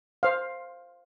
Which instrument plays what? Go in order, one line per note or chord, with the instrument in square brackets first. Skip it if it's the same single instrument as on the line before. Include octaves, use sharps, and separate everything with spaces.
[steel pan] C5 F5